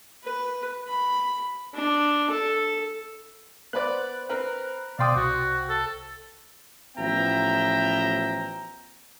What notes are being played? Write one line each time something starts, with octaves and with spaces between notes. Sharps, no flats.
B4
B5
D4
A4
B3 B4 C5 D5 F#6
C4 A#4 B4
B2 D5 F5 G5 C6 D#6
C2 F#4
A4
A1 F3 B3 E5 G5 A#5